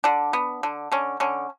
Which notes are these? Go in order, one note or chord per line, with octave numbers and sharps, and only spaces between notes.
D3 D4
B3
D3
D3 C#4
D3 C#4